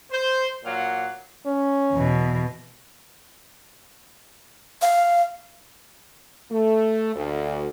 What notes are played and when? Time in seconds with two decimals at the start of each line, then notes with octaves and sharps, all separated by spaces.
0.11 C5
0.65 A#2 F#3 F5 F#5
1.46 C#4
1.95 E2 B2
4.82 F5
6.51 A3
7.15 D2